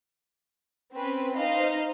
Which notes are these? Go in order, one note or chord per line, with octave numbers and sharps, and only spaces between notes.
C4 C#4 B4
D#4 C5 D#5 F5